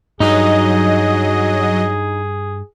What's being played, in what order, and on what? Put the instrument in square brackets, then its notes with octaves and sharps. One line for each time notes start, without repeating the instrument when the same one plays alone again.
[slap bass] G2 [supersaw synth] F#3 D#5 [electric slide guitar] D#4 [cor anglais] G#4